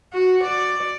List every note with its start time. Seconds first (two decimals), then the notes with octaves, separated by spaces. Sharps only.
0.13 F#4
0.44 D5